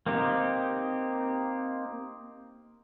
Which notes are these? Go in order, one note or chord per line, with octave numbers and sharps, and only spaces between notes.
A#3 C4 D#4 G4